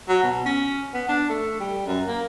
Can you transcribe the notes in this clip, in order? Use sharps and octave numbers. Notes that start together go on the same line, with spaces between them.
F#3
B2
C#4
B3
D4
A3
G3
F#2
A#3